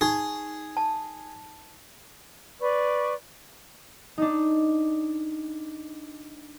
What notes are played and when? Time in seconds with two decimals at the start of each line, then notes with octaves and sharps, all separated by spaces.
0.01 D#4 G#4 C#6
0.77 A5
2.60 B4 D5 C#6
4.18 D4 D#4